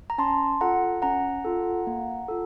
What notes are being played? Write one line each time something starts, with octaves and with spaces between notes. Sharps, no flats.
A#5
C#4 A5 C6
F4 A4 F#5 A#5
C#4 F#5 A#5
F4 A4
A#3
F4 A4